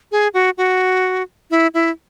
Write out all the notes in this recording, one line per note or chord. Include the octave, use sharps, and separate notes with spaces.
G#4
F#4
F#4
E4
E4